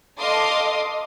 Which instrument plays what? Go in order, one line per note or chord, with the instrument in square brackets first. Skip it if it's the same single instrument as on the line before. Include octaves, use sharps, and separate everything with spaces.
[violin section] A4 D#5 F5 C6 D6 D#6